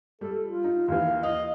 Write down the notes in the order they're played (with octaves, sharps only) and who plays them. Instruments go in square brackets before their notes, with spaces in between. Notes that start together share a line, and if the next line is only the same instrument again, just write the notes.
[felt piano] G3 [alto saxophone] A4
[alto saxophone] F4
[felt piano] D#4
[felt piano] D#2 E3 [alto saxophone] F5
[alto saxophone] D#5 [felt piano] F5